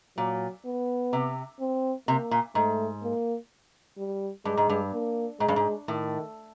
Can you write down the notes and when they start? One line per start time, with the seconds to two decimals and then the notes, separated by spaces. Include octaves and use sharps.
0.17 A#2 F#3
0.65 B3
1.13 C3
1.60 C4
2.07 C3 A#3
2.31 A#2
2.55 G#2 A3
3.03 A#3
3.98 G3
4.45 G2 G#3
4.57 G#2
4.69 G2
4.93 A#3
5.40 G#2 G#3
5.48 G2
5.56 G#2
5.88 A2 D#3